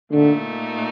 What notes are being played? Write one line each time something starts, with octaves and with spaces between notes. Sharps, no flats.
A#2 D3 A3 D#4